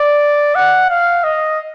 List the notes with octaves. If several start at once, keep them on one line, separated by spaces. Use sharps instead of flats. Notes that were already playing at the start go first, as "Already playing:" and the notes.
Already playing: D5
F#5
F5
D#5